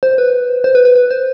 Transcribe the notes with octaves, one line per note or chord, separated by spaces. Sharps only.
C5
B4
C5
B4
B4
B4
C5